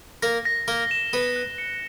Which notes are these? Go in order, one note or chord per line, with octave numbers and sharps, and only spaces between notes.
A#3 A#4 A#6
A#6
A#3 A#4 G7
E7
B3 B4 E7
F#6
C#7